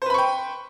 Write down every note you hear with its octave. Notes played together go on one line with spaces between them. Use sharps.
B4 C5 G5 B5 C#6